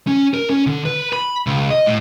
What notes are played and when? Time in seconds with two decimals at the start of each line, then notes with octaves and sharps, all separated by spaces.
0.07 C#4
0.34 A#4
0.50 C#4
0.67 D3
0.85 B4
1.13 B5
1.47 C#2
1.70 D#5
1.86 A2